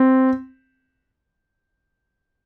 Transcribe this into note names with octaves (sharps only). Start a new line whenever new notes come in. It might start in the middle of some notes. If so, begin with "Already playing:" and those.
Already playing: C4